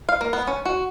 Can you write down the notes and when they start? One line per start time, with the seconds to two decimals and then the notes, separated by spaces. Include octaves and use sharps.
0.09 F5
0.21 A#3
0.33 B3
0.47 C#4
0.65 F#4